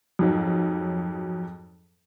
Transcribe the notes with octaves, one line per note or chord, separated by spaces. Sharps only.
F2 G#2 F#3